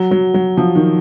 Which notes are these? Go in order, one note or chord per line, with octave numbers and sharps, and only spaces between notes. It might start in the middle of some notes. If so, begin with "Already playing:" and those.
Already playing: F#3
F#3
F#3
F3
D#3